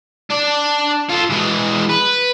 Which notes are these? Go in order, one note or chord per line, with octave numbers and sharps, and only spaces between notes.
D4 D5
F4 A4
E3 G#3
B4